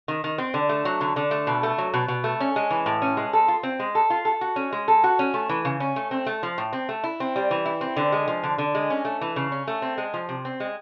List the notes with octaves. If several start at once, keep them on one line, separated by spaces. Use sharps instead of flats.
D#3
D#3
C4
D3
A3
F#3
D3
D3
A3
B2
A3
F#3
B2
B2
A3
C#4
G#3
E3
A2
C#4
G#3
A4
F4
C4
G#3
A4
F4
A4
F#4
C#4
G#3
A4
F#4
C#4
A3
E3
C#3
C#4
A3
C4
A3
F3
A2
C4
A3
E4
C4
G3
E3
E4
C4
D3
G#3
F3
D3
D3
G#3
C#4
A3
E3
C#3
C#4
A3
C4
G#3
F3
C3
C4
G#3